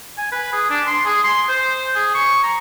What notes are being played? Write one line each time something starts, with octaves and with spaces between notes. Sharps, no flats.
G#5
B4
G#4
D4
C6
G#4
C6
C5
G#4
C#6
A#5